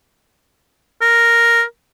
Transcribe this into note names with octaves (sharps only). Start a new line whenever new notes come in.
A#4